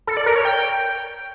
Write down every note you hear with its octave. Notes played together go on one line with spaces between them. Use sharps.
A4
D5
A#4
C#5
G5